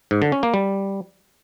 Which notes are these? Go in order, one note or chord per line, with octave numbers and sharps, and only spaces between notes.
G#2
D3
C#4
A#3
G3